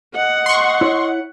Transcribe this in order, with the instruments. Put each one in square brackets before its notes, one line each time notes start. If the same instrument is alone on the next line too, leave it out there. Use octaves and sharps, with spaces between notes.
[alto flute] D#5 [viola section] F#5
[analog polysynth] C6 C#6
[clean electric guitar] E4 C#5